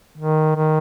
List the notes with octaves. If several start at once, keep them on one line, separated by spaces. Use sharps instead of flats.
D#3
D#3